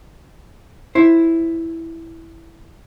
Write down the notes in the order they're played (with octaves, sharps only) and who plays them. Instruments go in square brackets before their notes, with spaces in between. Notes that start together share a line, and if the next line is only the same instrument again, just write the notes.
[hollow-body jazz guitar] E4 C5